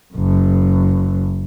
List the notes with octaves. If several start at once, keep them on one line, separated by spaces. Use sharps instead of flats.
F#1 F#2